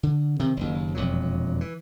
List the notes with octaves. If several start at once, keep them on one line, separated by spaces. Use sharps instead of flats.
D3
C3 D#3 C4
F#1 D#2
E1 F2 A#2 F#3
E3